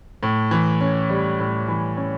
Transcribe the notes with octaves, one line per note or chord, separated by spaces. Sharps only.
A2
E3
C#4
G3
A2
E3
C#4